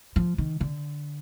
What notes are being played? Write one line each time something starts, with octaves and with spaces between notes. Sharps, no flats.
F3
D#3
D3